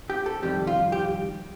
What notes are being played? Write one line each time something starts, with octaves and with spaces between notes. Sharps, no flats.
G4
A4
F2 C3 D#3 G3 G4
F4
G4